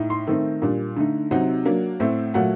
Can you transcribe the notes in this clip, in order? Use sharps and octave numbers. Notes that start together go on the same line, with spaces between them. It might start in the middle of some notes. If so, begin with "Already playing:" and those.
Already playing: A2 D#4
C6
D#3 A3 C4 D#4
A#2 G3 D4
D3 A3 D#4
C3 F#3 C4 D#4 F#5
F#3 A#3 D4
A2 A3 C4
A#2 F#3 A3 F#5